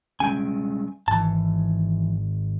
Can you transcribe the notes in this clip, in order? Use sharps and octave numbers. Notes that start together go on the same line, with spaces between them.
G3 G#3 C#4 G5 G#5
G#1 E3 A5